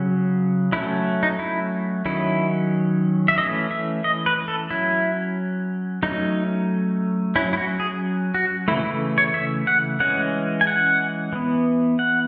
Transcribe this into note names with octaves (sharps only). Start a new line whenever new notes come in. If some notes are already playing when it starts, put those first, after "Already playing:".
Already playing: C#3 F#3 C#4
F#3 A3 C#4 E4
D#4
E4
D#3 F#3 C#4 E4
E5
E3 A3 C#4 D#5
E5
D#5
B4
A4
F#3 C#4 E4
F#3 A3 C#4 D#4
F#3 C#4 E4
E4
F#4
G#4
F#4
C#3 E3 A3 E4
E4
C#5
E5
F#5
E3 G#3 C#4 F#5
G#5
F#5
E3 B3
F#5